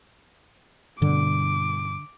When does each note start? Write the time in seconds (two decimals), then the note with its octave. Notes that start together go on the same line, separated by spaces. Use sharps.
1.02 G2 B2 D3 D6